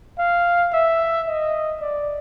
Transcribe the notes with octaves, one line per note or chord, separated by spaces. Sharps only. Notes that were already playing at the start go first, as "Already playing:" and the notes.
F5
E5
D#5
D5